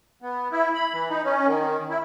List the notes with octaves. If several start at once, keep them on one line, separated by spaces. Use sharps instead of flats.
B3
E4
B5
E3
D#4
C#4
D#3
E4